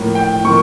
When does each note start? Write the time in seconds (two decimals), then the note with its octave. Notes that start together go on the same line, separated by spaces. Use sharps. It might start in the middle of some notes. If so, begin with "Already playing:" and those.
Already playing: A2 F3 A#3
0.15 G5
0.44 A2 F3 A#3 C#6